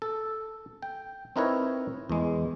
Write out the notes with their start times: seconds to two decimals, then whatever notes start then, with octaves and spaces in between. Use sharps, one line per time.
0.02 A4
0.82 G5
1.36 C4 D#4 E4 A#4 B4 C#5
2.09 E2 G#3